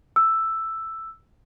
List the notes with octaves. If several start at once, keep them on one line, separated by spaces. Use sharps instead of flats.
E6